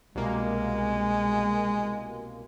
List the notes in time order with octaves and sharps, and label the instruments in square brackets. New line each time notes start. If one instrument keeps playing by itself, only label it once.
[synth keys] C2 B2 A#3 [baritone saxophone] G#3